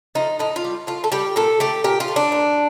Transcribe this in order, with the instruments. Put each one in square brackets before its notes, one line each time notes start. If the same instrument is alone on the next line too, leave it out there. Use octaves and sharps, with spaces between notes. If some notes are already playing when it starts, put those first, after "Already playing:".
[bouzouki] F3 A3 D#4
A2 D#4
F4
G3
A2 F4
A4
G3 G4
A#2 A4
A3 G4
A#2 G4
F4
A3
D4
A#2